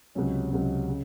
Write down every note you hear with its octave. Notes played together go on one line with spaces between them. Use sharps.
C#2 C3 F#3 C#4
C#2 C3 F#3 C#4
C#3